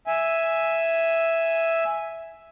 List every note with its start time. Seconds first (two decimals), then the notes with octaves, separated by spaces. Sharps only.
0.07 E5 G#5